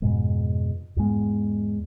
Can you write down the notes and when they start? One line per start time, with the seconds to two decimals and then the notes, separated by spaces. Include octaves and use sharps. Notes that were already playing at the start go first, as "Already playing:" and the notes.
0.02 F2 G#2 B2 G#3
0.96 E2 G#2 G#3 B3